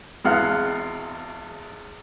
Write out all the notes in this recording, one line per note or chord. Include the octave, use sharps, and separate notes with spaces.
G#1 E2 G#3 F5 F#5 F6